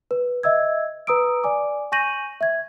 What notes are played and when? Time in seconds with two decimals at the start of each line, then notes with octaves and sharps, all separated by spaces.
0.11 B4
0.43 D#5 E5 E6 G#6
1.07 B4 A#5 D#6 E6 D7
1.44 D5 G#5 D6
1.92 G#5 C#6 G6 A#6 D#7 F#7
2.41 E5 G#6